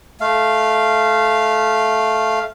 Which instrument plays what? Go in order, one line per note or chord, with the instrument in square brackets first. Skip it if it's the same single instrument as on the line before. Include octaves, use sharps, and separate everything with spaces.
[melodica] A3 F5